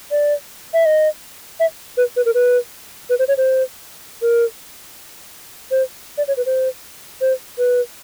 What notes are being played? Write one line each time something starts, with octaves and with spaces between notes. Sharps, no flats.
D5
E5
D#5
E5
B4
B4
A#4
B4
B4
C5
C#5
C5
A#4
C5
D5
C#5
B4
C5
C5
B4